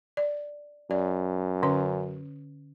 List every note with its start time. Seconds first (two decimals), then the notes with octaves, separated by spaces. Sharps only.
0.17 D5
0.91 F#2 D5
1.63 D3 C#4 C#5